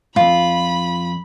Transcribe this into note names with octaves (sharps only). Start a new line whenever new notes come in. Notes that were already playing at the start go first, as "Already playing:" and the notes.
F2 G#2 F4 B5